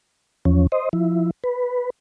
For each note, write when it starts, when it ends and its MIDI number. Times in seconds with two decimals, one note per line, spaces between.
0.45 0.67 40
0.45 0.67 53
0.45 0.67 61
0.72 0.89 72
0.72 0.89 75
0.93 1.31 53
0.93 1.31 64
1.44 1.90 71